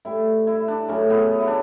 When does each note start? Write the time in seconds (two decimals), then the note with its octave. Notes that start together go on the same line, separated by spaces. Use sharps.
0.05 A2 G3 E4
0.47 E4
0.68 D4
0.88 C#3 F#3 A3 C#4
1.10 B3
1.40 E4
1.47 D4